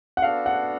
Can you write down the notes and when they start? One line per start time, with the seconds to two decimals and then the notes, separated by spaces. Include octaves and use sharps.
0.17 F#5
0.22 B3 D4 F#4 A4 F5
0.46 F#5